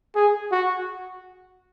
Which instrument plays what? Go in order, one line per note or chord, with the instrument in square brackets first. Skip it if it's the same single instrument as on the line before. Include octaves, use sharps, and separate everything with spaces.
[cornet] G#4
F#4